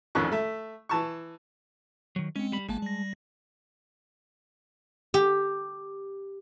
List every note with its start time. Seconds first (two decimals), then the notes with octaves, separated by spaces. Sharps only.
0.15 A1 F2 D#3 C#4 C#6 F#6
0.31 A3 E5
0.89 E3 A5 C#6
2.16 D#3 F#3
2.36 G#3 C4 C#4
2.52 G3 B5
2.69 G#1 G#3 A#3 A5
2.82 G3 A#6
5.14 G4